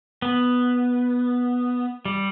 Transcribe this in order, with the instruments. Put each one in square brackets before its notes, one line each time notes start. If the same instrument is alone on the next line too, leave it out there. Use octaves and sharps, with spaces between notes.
[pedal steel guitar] B3
G3